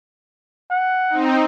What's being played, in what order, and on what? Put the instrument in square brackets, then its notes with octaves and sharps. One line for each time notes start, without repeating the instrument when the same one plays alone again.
[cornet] F#5
[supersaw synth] C4 D#4